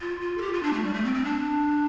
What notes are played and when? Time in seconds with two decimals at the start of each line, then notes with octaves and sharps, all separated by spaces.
0.01 F4
0.21 F4
0.38 A4
0.42 G4
0.53 F4
0.63 D4
0.73 A3
0.84 G3
0.94 A3
1.04 C4
1.14 C4
1.24 D4